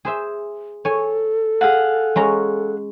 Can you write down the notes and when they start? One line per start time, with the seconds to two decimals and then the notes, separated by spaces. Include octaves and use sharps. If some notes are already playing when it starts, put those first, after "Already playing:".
0.05 G#4 C5 E5
0.85 A4 C#5 G#5
1.61 G#4 F5 F#5
2.16 G#3 C#4 A#5